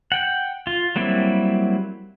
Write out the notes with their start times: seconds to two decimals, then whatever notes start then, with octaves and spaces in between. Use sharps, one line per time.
0.12 F#5 G5
0.67 F4
0.96 F#3 G3 A#3 C4 E4